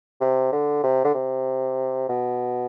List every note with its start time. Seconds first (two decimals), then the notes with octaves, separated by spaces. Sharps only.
0.21 C3
0.52 D3
0.83 C3
1.04 D3
1.14 C3
2.09 B2